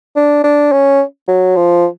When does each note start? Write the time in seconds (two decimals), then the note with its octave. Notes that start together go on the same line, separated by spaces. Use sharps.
0.16 D4
0.44 D4
0.72 C#4
1.28 F#3
1.56 F3